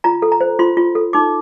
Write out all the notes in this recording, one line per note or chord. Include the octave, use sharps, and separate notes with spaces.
F4 A#5
A4
A#5
C5
F4 C6
F4
A4
D#4 D6